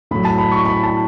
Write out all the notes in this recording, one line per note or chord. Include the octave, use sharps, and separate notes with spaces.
A2 F#3 B5
A5
B5
C#6
B5
A5